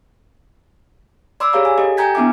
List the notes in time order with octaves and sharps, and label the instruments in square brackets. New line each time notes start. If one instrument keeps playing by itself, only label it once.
[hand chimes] D5 B5 C6 D6 E6
G4 G#4 C#5 F5 A#5
G#5
G4 A4 D#5
G5 G#5 A#5 G6 G#6 B6
B3 D4 E4 E5 D6